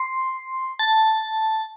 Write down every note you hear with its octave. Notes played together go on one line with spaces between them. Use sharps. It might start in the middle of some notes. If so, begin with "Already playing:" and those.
Already playing: C6
A5